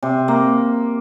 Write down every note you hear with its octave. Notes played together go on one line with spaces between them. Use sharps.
C3
A#3